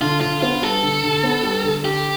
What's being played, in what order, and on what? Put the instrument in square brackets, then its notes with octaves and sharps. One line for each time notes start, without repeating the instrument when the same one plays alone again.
[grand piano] D3 [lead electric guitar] F4
[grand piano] D3 [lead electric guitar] F4
[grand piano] B3 [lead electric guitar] F4
[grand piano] G3 [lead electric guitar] A4
[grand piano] D3
D3
B3
G3
D3
[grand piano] D3 [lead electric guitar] G4